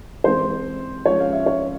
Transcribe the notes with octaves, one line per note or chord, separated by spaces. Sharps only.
E3 G#3 C4 C5
F3 G#3 C#4 C#5
F5
E5
C#5